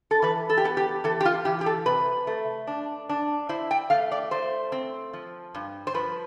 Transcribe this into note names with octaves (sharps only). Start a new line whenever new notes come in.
A4
E3 B4
A4
G4
B3 A4
G4
E3 A4
G4
F4
E3 G4
G4
A4
C3 B4
A3
D4
D4
E4 C5
G5
A3 F5
D5
A3 C5
C4
F3
G2
C5
F3 B4